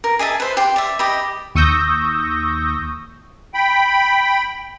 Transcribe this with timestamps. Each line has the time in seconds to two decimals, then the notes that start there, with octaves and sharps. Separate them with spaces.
0.04 A#4
0.19 G#4 D#5 E5 A5
0.40 B4 C5
0.57 G4 C6
0.76 D5 E5
0.99 G4 D#5 B5
1.55 D#2 C#6 D#6 E6 G6 A#6
3.54 G5 B5